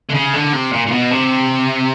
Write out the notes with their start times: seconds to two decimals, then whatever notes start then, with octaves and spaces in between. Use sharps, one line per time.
0.09 D3
0.14 C#3
0.33 D3
0.53 C3
0.72 A#2
0.87 A#2
0.91 B2
1.11 C3